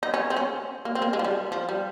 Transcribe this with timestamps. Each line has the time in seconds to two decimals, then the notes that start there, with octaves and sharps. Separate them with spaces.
0.03 D#4
0.14 C#4
0.30 C4
0.37 C#4
0.85 A#3
0.95 C4
1.02 A#3
1.13 G#3
1.19 F3
1.24 G3
1.52 F3
1.69 G3